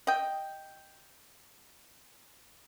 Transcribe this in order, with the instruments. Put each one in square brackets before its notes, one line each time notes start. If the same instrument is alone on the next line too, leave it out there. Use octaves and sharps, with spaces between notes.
[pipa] D#5 G5